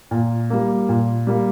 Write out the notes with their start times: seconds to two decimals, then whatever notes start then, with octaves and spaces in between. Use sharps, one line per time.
0.11 A#2
0.50 G3 A#3
0.89 A#2
1.27 G3 A#3